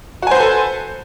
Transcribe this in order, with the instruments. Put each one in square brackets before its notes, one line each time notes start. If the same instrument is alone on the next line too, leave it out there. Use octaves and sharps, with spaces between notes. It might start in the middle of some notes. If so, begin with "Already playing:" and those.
[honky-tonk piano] F#4
G#5
C5
B4
A4